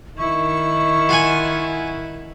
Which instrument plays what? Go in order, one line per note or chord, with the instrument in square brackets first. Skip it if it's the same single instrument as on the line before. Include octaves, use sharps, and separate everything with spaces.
[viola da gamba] D#3 [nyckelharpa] E4 [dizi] C#6
[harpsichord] F4 F#5 G#5